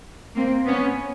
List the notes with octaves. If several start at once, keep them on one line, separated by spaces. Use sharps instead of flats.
A#3 C4
B3 C#4